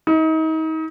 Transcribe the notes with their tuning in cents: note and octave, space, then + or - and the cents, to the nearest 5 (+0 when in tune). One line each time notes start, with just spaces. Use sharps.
D#4 +35